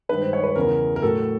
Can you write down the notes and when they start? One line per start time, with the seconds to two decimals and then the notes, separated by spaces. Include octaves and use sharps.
0.09 G2 D#3 G#3 B4
0.21 C5
0.33 C#5
0.44 B4
0.56 E2 C#3 E3 A#4
0.96 A#4
1.02 A2 F#3 A4